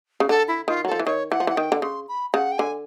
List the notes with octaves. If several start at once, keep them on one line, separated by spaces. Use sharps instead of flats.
C#3
D3 A4
E4
D#3 F4
F#3
F3 A4
E3
D#3 C#5
E3 F#5
F3
E3 F#5
D#3 G5
D3
C#3 C6
B5
C#3 F#5
G5
D3 G#5